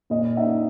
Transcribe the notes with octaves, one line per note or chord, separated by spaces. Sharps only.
A#2 D#5
D#4 E5